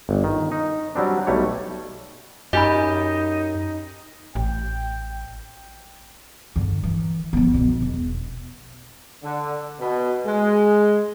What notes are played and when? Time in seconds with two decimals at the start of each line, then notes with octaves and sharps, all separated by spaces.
0.09 G1
0.24 D#3
0.52 D#4
0.95 F#3 G3 C4 D4
1.27 B1 G3 A3 C#5
2.53 F#2 D#4 G4 D#5 G#5 B5
4.35 A1 G5
6.56 G2 D3
6.83 E3
7.33 F3 B3
7.53 B1 B2
7.82 E1
9.23 D3
9.79 B2
10.26 G#3